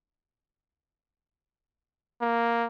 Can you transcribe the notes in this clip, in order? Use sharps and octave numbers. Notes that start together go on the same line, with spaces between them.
A#3